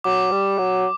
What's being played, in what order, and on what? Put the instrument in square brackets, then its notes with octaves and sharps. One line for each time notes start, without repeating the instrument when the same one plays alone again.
[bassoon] F#3 [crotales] D6
[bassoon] G3
F#3